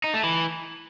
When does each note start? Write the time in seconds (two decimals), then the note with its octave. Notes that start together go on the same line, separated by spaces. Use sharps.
0.04 D#4
0.14 A3
0.24 E3